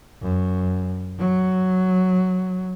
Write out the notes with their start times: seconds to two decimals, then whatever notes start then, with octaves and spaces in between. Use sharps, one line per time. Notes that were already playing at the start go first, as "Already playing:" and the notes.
0.22 F#2
1.19 F#3